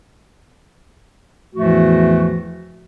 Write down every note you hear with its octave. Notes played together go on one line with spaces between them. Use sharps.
E2 A2 E3 F3 A3 F#4